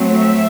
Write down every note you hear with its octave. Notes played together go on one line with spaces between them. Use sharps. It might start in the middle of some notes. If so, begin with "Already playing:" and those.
Already playing: F#3 A3 C4
E5